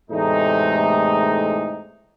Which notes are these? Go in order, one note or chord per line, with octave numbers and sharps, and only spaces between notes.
E2 A2 C3 G#3 A3 D#4